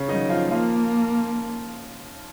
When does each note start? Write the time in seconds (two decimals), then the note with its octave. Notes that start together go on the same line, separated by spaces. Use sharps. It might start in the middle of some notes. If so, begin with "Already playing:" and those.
Already playing: C#3 C#4
0.08 D#3 F#3 D#4
0.30 F3 F4
0.51 F3 A#3 F4